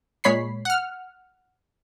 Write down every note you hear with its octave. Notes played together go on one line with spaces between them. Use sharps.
A#2 G#3 C#5 B5 B6 C7
F#5 F6